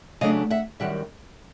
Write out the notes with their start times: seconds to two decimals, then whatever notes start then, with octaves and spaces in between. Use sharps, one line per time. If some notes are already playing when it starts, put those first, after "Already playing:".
0.21 C#3 F#3 A3 D4 D#5 F5
0.50 E5 F#5
0.80 F#2 D#3 G3 E5 F#5